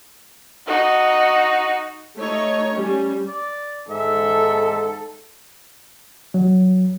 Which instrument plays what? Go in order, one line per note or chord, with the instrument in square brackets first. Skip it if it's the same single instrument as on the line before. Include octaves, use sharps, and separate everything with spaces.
[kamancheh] D#4 F#4
[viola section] A3 D#4 C#5
G3 C#4
[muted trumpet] D5
[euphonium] G#2 [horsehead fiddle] A4 [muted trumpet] E5
[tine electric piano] F#3